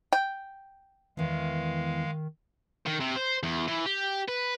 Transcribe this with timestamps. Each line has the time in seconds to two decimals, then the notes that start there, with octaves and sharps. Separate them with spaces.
0.13 G5
1.17 E2 D#3 E3 G#3 F5
2.86 D#3
3.00 C3
3.16 C5
3.43 E2
3.68 E3
3.86 G4
4.28 B4